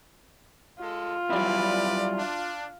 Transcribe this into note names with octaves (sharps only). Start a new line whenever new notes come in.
G#3 F4 A4
F#3 G3 E4 B4 D5
D4